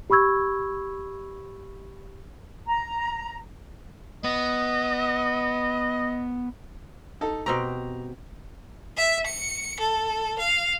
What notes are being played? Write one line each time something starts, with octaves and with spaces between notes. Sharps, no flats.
G4 B5 C#6 E6 G#6
A#5
B3 D#5
D#4 A4
B2 C4 G4 A#5
E5
C#7
A4
F5